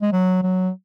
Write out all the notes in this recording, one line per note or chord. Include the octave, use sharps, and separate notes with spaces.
G#3
F#3
F#3